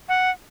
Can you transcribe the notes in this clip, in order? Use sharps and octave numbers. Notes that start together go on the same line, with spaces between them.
F#5